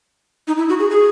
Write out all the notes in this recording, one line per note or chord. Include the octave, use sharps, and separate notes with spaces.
D#4
E4
F#4
G#4
G#4